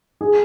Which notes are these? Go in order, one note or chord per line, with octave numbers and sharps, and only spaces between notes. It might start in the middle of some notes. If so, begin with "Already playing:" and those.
G#4